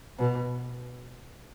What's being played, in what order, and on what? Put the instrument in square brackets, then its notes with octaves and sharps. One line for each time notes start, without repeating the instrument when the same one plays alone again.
[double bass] B2